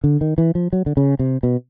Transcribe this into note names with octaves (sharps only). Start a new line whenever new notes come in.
D3
D#3
E3
F3
F#3
D3
C#3
C3
B2